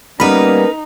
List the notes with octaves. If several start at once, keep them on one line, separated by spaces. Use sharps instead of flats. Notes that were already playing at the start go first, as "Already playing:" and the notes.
G3 A#3 B3 C#4 D#4 A#4 B4 B5